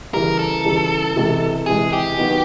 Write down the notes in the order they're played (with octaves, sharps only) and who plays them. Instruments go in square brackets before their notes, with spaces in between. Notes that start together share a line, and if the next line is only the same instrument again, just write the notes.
[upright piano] C#3 E3 G3 [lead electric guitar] A#4
[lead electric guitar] A4
[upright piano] C#3 E3 G3
C3 E3 G#3
[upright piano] C3 E3 G#3 [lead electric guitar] G#4
[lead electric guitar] G4
[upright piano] D#3 F#3 B3 D#4 F#4